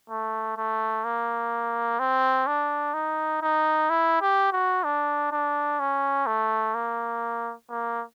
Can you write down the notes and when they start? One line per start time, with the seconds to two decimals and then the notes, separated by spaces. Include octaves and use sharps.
0.10 A3
0.57 A3
1.05 A#3
1.99 C4
2.47 D4
2.94 D#4
3.42 D#4
3.90 E4
4.22 G4
4.53 F#4
4.84 D4
5.32 D4
5.80 C#4
6.27 A3
6.75 A#3
7.70 A#3